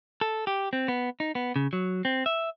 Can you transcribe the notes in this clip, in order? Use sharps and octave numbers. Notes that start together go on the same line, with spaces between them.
A4
G4
C4
B3
D#4
B3
C#3
F#3
C4
E5